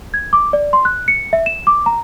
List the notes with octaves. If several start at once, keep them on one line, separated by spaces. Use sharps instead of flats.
G#6
D6
D5
C6
F#6
C#7
E5
E7
D6
A#5